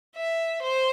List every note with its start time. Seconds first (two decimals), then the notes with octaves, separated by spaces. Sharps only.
0.16 E5
0.62 C5